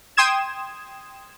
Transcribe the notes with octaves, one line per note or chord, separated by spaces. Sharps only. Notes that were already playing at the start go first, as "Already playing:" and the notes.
G5 C6 D#6 G#6 E7